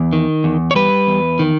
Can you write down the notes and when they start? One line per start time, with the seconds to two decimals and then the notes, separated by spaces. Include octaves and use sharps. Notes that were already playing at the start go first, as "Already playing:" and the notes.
Already playing: E2
0.13 D#3
0.44 E2
0.71 C#5
0.75 G3 B4
1.07 E2
1.39 D#3